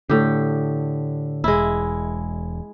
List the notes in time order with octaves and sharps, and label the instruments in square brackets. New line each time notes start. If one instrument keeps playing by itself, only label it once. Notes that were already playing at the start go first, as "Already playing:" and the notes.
[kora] A2 G4 [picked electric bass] D3
[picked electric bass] E1 [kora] G#3 E4